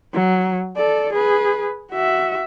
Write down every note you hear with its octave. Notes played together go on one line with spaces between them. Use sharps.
F#3
A4 D5
G#4 B4
F#4 E5